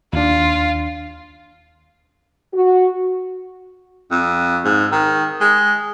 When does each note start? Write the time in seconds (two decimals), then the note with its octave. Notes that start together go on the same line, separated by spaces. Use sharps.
0.13 D#2 D4 F4
2.54 F#4
4.11 F2
4.65 G#2
4.92 D#3
5.41 G#3